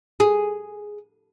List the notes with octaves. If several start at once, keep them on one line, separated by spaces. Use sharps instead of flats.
G#4